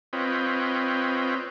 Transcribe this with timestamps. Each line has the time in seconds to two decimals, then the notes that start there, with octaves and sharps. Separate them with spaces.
0.13 C4 F4 B4 C#5 D#5 G5